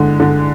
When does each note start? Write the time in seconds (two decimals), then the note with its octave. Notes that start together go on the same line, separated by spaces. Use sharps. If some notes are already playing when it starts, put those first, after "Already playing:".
Already playing: D3 G#3
0.20 D3